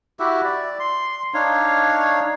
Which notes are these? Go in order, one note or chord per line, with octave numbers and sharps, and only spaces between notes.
E4 F#4 G4 E5
D5
C6
D4 D#4 C#5 F5